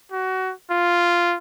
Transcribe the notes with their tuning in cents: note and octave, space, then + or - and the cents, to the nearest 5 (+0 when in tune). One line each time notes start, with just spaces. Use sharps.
F#4 +20
F4 -5